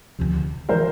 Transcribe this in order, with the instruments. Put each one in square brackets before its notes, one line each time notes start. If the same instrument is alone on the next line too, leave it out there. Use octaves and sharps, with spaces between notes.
[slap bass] D2 C3 F3
[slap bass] E3 G#3 [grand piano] A#4 C5